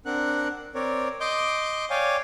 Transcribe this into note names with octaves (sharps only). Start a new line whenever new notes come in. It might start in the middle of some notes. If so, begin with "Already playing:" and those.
C4 D4 A#4 F#5 F#6
C4 A#4 C#5 D5
D#5 C6 D6 G6
C#5 D5 F5 G5 G#5